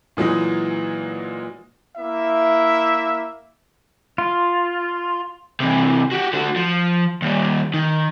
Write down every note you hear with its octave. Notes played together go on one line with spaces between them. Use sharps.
A#2 E3 F#3 G#3 D#4
A#3 E4 E5
F4
C3 E3
F#4 G4
D3 F#4
F3
D#2 G3
D#3